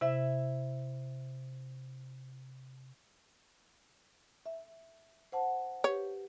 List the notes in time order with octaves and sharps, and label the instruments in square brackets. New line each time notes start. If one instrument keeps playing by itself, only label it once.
[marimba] C3 [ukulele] E4 E5
[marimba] E5
C5 F#5 A5
[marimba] G4 B4 [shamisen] C#5